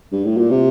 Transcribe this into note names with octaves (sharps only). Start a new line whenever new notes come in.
G2
A2
A#2
C3